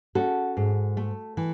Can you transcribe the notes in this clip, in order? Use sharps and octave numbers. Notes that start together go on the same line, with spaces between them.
C#4 F#4 A4
G#2
A3
E3